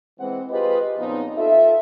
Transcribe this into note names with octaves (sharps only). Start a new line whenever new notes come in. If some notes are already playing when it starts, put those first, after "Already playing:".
E3 G#3 C4 F#5
F4 G4 G#4 B4 C5 D#5
A#2 C#3 F3 B3 C4 D#4
F4 A4 E5